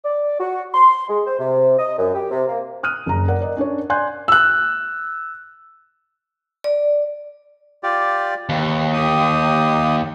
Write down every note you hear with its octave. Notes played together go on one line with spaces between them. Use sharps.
D5
F#4
C6
G#3
C5
C3
D#5
F#2
G4
C3
A#3
D#6 F6 F#6 D#7
F#1 A#5
A#4 D5 F#5
A#4 D5 D#5
C#4 D4 A#4 C#5
D5 G#5 C6 F#6 G6
E6 F#6
D5
F4 G4 D5
D#2 B4
G4 D#6